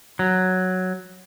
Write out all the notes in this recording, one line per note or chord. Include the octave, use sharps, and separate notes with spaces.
F#3